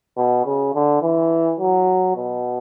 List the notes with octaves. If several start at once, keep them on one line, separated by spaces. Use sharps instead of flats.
B2
C#3
D3
E3
F#3
B2